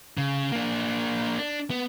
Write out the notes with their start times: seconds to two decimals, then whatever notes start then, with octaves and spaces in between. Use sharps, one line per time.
0.17 C#3
0.52 A#3 D4
1.39 D4
1.71 B3